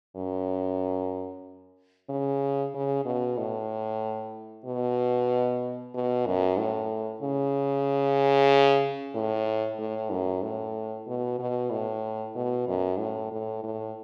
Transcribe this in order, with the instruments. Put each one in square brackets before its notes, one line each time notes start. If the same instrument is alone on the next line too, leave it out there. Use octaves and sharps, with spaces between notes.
[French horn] F#2
C#3
C#3
B2
A2
B2
B2
F#2
A2
C#3
A2
A2
F#2
A2
B2
B2
A2
B2
F#2
A2
A2
A2